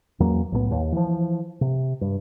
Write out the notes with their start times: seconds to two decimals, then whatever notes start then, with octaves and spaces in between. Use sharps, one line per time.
0.20 E2 F#3 A#3 C#4
0.52 B1 A2 D#3 B3
0.71 D#2
0.92 E3 F3
1.61 C3
2.01 G2